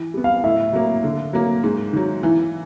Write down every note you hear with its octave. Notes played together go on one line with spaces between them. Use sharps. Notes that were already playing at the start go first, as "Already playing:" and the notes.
Already playing: E3
G3 B3
F5
A2 E5
F#3 A#3
D3
F#3 A#3
G#2
D#3 F#3
E3